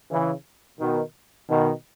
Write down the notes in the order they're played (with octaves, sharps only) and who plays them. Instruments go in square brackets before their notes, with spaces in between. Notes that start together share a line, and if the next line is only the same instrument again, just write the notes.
[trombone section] C#3 E3
B2 D#3
B2 D#3